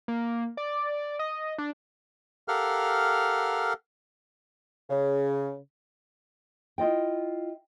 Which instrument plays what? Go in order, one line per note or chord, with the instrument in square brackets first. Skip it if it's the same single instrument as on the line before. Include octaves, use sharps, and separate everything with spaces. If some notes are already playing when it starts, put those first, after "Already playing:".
[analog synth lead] A#3
D5
D#5
D4
[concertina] G4 A4 A#4 F5 F#5 F6
[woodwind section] C#3
[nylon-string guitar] E4 F4 D#5 G5